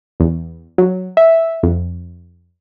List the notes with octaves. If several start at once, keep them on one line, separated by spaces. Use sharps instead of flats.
E2
F#3
E5
F2